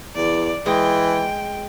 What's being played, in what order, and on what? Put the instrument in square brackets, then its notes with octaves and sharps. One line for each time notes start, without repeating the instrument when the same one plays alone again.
[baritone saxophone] E2 [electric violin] D5
[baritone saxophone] E3 [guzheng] G#3 G#4 [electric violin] G5